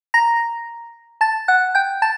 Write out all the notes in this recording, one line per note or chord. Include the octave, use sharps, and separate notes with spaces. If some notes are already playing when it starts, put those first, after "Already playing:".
A#5 A#6
A5 A6
F#5 F#6
G5 G6
A5 A6